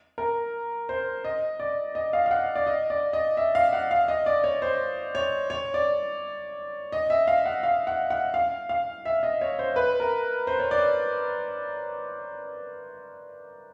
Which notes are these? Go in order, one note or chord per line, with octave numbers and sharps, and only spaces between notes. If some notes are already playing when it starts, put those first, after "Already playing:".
A#4
C5
D#5
D5
D#5
F5
F5
F#5
D5
D#5
D5
D#5
E5
F5
F#5
F5
D#5
D5
C#5
C5
C#5
C#5
D5
D#5
E5
F5
F#5
F5
F#5
F#5
F5
F5
E5
D#5
C#5
C5
B4
A#4
C5
C#5
D5